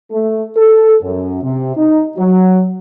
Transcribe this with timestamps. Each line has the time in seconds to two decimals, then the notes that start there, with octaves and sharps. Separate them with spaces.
0.11 A3
0.56 A4
1.02 F#2
1.42 C3
1.77 D#4
2.17 F#3